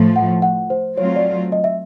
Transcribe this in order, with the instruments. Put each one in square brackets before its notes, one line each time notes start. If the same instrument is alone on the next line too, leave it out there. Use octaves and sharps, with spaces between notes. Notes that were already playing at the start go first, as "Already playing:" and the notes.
Already playing: [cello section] A2 F3 A3
[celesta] F#5
F#5
C5
[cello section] F#3 A3 C4 F4 [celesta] C#5
[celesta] D5
D#5
E5